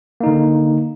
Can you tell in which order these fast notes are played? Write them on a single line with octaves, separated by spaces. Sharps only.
A#3 D#4 D3